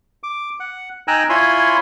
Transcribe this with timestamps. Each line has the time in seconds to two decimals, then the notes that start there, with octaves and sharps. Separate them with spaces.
0.23 D6
0.60 F#5
1.08 D#4 G5 G#5 A#5 E6 F#6
1.30 E4 F4 C#5 G#5 B5 C6